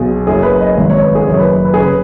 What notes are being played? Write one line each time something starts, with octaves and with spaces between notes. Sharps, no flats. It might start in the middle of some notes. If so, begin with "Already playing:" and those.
Already playing: B1 B2 G#4
F#1 F#2 C#3 G#4
B4
D#5
G#1 G#2 D#3
C#5
B4
G#4
F#1 F#2 D#3 C#5
B4
B4
G#4
C#3 B4